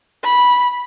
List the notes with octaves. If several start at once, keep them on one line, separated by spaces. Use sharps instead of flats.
B5